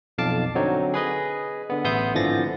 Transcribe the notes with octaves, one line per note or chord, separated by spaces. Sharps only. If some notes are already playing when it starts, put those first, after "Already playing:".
B1 F2 F5 A5 D6
D3 F#3 C4 D#4 C#5
G#4 B4 D#5
D3 B3
A1 B3 E5 C6 D#6 G6
G#1 D3 E3 F3 A6 A#6